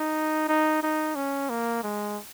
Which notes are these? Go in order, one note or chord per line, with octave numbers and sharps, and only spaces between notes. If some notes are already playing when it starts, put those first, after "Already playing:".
Already playing: D#4
D#4
D#4
C#4
A#3
G#3